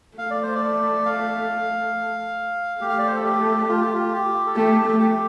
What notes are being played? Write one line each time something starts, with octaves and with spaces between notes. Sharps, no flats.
A3 F5
D5
C5
D5
F5
A3 G4
F5
D5
C5
A4
G4
F4
G4
F4
G4
A4
A3 G4
A3
G4